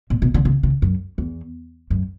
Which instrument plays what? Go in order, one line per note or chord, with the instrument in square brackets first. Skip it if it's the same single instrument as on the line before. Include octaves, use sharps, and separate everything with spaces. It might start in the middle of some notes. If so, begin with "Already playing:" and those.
[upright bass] A#2
B2
D3
C#3
C#3
F#2
E2
F#2